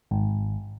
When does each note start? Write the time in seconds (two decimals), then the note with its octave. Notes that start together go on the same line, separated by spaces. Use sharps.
0.11 G#1